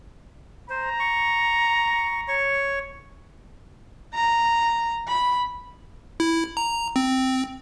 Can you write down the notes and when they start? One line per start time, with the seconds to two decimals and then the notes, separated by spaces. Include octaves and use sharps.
0.70 C5 A#5
1.00 C#6
2.28 C#5 C#6
4.14 A#5
5.08 B5
6.20 E4
6.57 A#5
6.96 C4